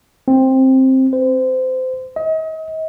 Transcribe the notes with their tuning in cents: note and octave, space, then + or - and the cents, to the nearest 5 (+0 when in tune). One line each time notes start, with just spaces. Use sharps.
C4 +10
C5 -25
D#5 +35